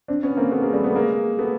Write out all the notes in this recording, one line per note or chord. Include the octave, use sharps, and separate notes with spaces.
C4 D4
B3 C#4
A#3 C4
A3 B3
G#3 A#3
G3 A3
A3 B3
G#3 A#3
A3 B3